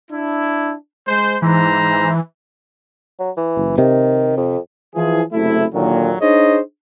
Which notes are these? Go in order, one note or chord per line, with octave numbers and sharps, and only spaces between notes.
D4 E4
G#3 C5
G#2 E3 C5 A#5
F#3
E3
F#1
C3 D#3
F2
E3 F3 G#4
F#1 C3 A3 E4
D#2 A#2 D3 D#3 F#3
D4 D#4 G#4 C5 C#5 D#5